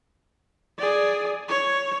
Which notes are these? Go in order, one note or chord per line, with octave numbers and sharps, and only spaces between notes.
G#4 D5
C#5